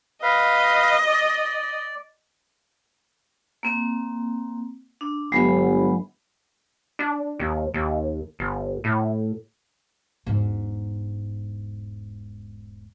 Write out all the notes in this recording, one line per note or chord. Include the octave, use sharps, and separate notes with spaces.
B4 D#5 F5
D5
A#3 C4
D4
G1 F#3 G#3 B5
D4
D#2
D#2
G1
A2
E1 G#2